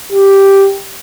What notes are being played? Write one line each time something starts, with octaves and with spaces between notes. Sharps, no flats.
G4